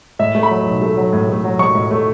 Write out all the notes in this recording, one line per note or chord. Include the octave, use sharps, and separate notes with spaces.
A2 E5
A3
B5
F#3
B1
A3
F#3
A2
A3
F#3
F#3 C#6
A2
A3